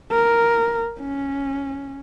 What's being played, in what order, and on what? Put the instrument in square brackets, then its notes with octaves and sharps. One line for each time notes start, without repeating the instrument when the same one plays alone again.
[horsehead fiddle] A#4
C#4